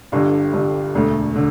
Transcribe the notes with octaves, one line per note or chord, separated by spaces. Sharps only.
G1 G2 D3 G3
G1 G2 D3 G3
E1 D2 D3 A3
D3